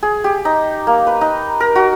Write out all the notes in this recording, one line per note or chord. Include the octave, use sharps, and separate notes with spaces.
G#4
G4
D#4
A#3
B4
D#4
A#4
F#4